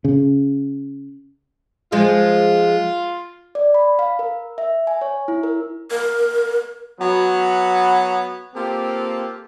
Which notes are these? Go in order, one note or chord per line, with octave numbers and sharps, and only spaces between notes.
C#3
F3 G#3 F4 G#4
D5
B5
F5
A#4
E5
G#5
C#5
E4
A#4
A#4
F#3 B3
A#3 C4 F4 G4 A4